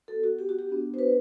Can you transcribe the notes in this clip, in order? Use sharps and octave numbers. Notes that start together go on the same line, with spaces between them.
B3 F#4 A4
F#4
G4
F#4
G4
B3 D4 F#4
C5
B4